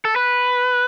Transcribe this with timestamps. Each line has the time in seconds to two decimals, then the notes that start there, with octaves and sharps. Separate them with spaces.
0.05 A4
0.16 B4